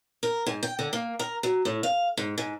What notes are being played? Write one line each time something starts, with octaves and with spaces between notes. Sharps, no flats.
A#4
G#2
G5
D3
A#3
A#4
F#3
A2
F5
G#2
G#2